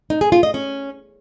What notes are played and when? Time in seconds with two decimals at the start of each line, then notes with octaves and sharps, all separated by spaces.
0.10 D#4
0.21 G#4
0.32 F4
0.43 D#5
0.54 C#4